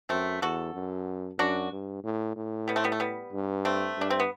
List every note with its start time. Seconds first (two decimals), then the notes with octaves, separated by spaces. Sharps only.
0.09 F#2 A3 C4
0.42 E2 F#4 A4
0.74 F#2
1.38 F#2 D4 F#4
1.72 G2
2.04 A2
2.36 A2
2.68 G3 B3
2.76 A3 C4
2.84 G3 B3
2.92 A3
3.00 G3 B3
3.32 G2
3.65 A3 C4
3.97 G2 D4
4.10 C4
4.20 B3